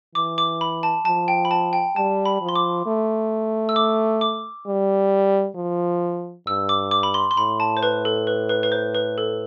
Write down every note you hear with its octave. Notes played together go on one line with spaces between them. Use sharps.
E3 D6
D6
B5
A5
F3 A5
G5
B5
A5
G5
G3 A5
B5
F3
C6
D6
A3
E6
D6
D6
G3
F3
G2 E6
D6
D6
B5
C6
C6
A2 B5
A5
C5
B4
A4
B4
B4
B4
C5
B4
A4